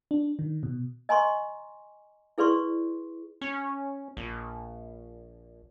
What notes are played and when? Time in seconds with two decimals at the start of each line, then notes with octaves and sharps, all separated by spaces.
0.11 D4
0.39 D#3
0.63 B2
1.09 D#5 G#5 A#5 C6 C#6
2.38 E4 G#4 B4 D5 C6 C#6
3.41 C#4
4.17 A#1